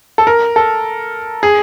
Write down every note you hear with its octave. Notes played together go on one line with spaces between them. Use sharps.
A4
A#4
A4
G#4